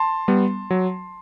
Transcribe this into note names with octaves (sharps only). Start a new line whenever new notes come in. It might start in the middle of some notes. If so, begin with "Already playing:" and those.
Already playing: A5 C6
G3 B3
F#3